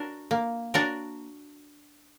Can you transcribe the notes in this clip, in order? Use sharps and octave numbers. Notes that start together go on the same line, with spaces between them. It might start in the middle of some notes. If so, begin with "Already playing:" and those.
Already playing: D4 F#4 A#4
A#3
D4 F#4 A#4 D5